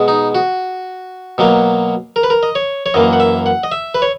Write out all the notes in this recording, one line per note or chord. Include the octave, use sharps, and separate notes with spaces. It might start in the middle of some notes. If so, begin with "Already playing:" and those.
Already playing: B2 G#3
D#4
F#4
B2 F#3 A#3
A#4
B4
A#4
D#5
C#5
C#5
F#2 E3 A#3 D#5
F#5
E5
F#5
D#5
E5
B4
C#5